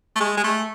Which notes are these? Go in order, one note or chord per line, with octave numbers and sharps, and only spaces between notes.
A3
G#3
G#3
A3